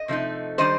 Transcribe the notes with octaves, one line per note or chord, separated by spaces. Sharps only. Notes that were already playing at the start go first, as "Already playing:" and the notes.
Already playing: D#5
C3 F3 A3 D#4
D#3 G3 D4 C5 D#5